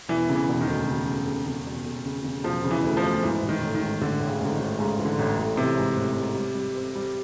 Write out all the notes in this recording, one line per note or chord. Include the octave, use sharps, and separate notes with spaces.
E1 E3
C#3
E3
E1
D#3
D2
C#3
C#3
C#3
C#3
E1
E1
C#3
C#3
E1 F3
C#3
E3
D2
F3
D2
G#2 E3
A1
D#3
A1
D#3
G#2
A1 D3
A1
C#3
G#2 D3
D#3
A1
G#2 C#3
E3
D3
A1
A1
C3 E3
G#2
A1
G#2
G3
G3
C4
G3